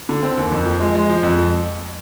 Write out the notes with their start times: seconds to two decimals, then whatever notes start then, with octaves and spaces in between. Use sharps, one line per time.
0.09 D3
0.23 C4
0.38 D#2
0.52 F2
0.65 F3
0.80 G#3
0.95 G#3
1.10 F3
1.23 F2